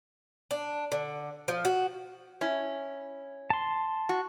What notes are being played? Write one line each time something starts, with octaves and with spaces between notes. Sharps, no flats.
D4
D3
F3
F#4
C#4 E4
A5 C6
F#4